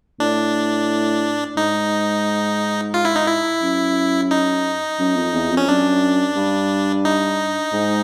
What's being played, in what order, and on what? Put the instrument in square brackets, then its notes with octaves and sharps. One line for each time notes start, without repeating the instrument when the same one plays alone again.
[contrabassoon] A2 [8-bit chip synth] D4
[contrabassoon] G#2 [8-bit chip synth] D#4
[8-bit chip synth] F4
E4
D#4
E4
[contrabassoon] F#2
[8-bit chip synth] D#4
[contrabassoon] F#2
F2
E2
F2
[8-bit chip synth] C#4
[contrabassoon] F#2 [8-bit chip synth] D4
[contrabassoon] G2
[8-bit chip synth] D#4
[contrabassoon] G#2